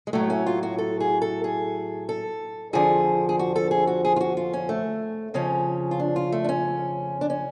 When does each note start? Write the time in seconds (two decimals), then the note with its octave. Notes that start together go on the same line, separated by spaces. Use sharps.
0.07 G#3
0.13 A2 F#3 A3
0.30 C#4
0.46 F4
0.63 F#4
0.78 A4
1.00 G#4
1.22 A4
1.44 G#4
2.09 A4
2.73 F2 D3 F3 G#4
3.29 G#4
3.39 F#4
3.56 A4
3.71 G#4
3.87 F#4
4.05 G#4
4.16 F4
4.21 F#4
4.37 F4
4.53 C#4
4.69 A3
5.34 F2 C#3 F3 C#4
5.91 F4
6.00 D4
6.16 F4
6.32 A3
6.44 D4
6.49 C#4
7.21 D4
7.30 C#4